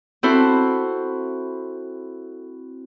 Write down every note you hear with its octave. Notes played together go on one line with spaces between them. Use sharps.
C4 E4 F#4 A4 C5